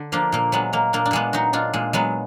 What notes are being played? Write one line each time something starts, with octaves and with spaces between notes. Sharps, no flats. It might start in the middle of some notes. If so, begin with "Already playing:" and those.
Already playing: D3
F3 A#3 D4
A#2 A#3
F#3 G#3 B3
F#3 A#3
A#2 A#3 D4
D4
A#2 G#3 B3
F#3 D#4 F#4
A#2 D4 F4
A#2 G#3
F#3 G#3 B3